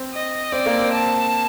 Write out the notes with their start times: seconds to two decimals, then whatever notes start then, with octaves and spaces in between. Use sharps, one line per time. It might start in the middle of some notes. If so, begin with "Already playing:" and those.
Already playing: C4
0.13 D#5
0.52 C4 D5
0.66 A#3
0.79 C4
0.93 A5